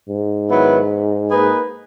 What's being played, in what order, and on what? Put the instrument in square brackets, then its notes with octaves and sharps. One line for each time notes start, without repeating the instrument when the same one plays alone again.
[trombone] G#2
[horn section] D#3 F#3 B3 E4 B4
A#3 D#4 G#4 B4